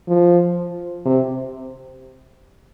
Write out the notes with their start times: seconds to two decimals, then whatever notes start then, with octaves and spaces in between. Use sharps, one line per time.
0.08 F3
1.05 C3